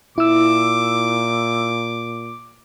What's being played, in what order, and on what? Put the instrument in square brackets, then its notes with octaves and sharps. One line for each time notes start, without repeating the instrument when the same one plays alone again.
[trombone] A#2 [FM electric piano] E4 E6 [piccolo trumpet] D6